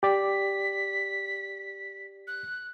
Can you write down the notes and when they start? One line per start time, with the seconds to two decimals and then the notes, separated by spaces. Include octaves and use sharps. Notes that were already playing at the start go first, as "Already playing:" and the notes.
0.03 G4 D5 B6
2.27 F#6